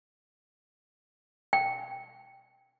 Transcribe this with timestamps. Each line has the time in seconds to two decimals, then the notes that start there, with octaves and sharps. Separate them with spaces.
1.53 G5